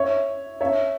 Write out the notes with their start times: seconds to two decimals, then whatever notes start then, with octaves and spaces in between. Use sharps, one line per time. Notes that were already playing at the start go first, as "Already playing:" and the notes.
Already playing: C#5 E5
0.61 C#5 E5